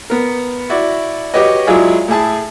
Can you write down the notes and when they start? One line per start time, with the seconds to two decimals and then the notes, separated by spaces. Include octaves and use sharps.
0.10 B3 A#4
0.70 E4 F#4 D5
1.34 F#4 G4 B4 C#5 D#5
1.67 F#3 G#3 E4 F4 G#4 D5
2.08 A2 E4 G#4 A5